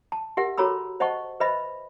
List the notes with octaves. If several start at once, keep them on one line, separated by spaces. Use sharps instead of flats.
A5
G4 A#4 E5 F#5
F#4 A4 C#5 A#5 B5 E6
C5 D#5 F#5 A5 C#6
B4 C5 D#5 E5 B5